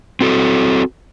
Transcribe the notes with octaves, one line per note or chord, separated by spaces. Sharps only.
C4 F#4 A4